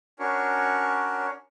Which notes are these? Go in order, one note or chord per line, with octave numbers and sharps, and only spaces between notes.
C#4 D4 F#4 A#4 C#5